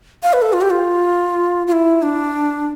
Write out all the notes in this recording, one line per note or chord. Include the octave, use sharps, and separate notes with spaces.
F5
B4
A4
F4
G4
F4
F4
E4
D4